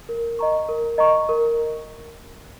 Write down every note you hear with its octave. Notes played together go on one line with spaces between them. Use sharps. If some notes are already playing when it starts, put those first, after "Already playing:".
A#4
D#5 A#5 C#6
A#4
D#5 A#5 C#6
A#4